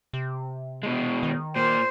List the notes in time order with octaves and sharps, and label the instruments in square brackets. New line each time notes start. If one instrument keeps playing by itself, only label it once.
[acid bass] C3
[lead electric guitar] B2 G#3
[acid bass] D#3
[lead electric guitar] A#2 A#3 [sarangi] C5